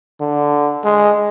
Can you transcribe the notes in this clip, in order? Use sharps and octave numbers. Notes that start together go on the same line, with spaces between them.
D3
G#3